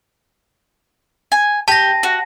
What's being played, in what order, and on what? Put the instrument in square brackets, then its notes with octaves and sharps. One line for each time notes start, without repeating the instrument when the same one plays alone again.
[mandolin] G#5
[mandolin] G4 [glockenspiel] A5 A#6
[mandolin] F#4